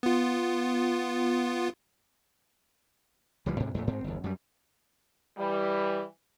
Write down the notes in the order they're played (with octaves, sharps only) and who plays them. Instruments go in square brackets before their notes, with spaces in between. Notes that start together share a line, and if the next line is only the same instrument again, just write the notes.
[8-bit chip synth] B3 F4
[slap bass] C#2 E3 F3 G3
D2 G#2 C3
F2 A#2 A3
G#2 C4
G1 E2
F#2 G3
[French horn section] E3 G3